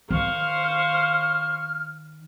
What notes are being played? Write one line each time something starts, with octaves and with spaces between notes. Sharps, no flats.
D#3 C5 F5 C#6 F6